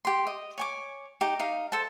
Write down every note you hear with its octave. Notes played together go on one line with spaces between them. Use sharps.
G4 C6
D#5
C#5 G#5 D6
D#4 G4
D#4 F5
A4 C5 A5